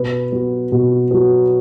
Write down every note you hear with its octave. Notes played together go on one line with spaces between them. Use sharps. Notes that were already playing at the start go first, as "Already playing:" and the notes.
Already playing: B2 B4
F#3 B3
B2
F#3 B3